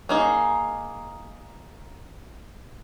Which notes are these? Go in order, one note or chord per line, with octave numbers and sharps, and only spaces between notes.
A#3 D#4 G#4